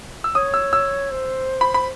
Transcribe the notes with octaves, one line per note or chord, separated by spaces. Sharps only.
E6
C#5 D#6
E6
E6
C5
B5
B5